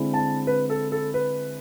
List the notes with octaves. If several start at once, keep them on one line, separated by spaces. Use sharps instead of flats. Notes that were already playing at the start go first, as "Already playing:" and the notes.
Already playing: D3 G#3 C4 E4
A5
B4
A4
A4
B4